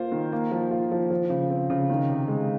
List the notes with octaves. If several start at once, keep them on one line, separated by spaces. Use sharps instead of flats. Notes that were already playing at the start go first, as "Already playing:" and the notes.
Already playing: A#3 F4 C5
D#3
A#3
F3
F4
F3
F3
C#3
C4
C#3
D#3
C3
G#3